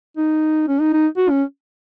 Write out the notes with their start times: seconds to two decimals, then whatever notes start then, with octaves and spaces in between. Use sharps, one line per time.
0.17 D#4
0.68 C#4
0.81 D#4
0.93 D#4
1.17 F#4
1.30 C#4